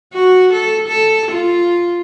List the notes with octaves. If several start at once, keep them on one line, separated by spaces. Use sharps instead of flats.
F#4
A4
A4
F4